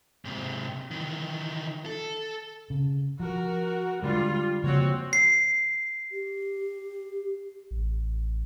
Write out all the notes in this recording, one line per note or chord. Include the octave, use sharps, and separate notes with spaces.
G#2 C3
D#3 E3
A4
C#3
F3 F#4 A#4
D3 G3 G#3 F4
C#3 F3 A#3 C4 F#4 C#5
C7
G4
A1